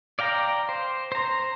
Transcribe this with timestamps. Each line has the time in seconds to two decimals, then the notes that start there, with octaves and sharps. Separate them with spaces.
0.19 D5 F5 G5 A#5
0.69 C5
1.12 C5 A#5